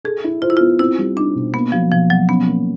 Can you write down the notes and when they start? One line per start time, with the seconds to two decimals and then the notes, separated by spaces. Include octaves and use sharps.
0.04 G#4 A4
0.24 E4
0.42 F4 C5
0.50 E4
0.57 B3 F4
0.79 C4 E4
0.99 G3
1.16 D4 D#4
1.35 B2
1.53 A#3 B3
1.72 F3 F#3
1.92 B2 F3
2.10 B2 F#3
2.28 B3 C#4
2.48 A#3